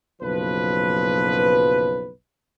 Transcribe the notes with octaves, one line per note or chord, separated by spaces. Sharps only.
F#1 B1 F3 B4